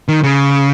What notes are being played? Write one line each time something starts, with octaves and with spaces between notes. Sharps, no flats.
D#3
C#3